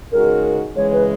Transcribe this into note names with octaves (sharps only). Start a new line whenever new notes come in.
C#3 G#3 D#4 F#4 A#4
C#3 E3 G#3 C#5
B4